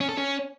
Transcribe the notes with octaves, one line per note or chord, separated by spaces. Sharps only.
C#4
A4
C#4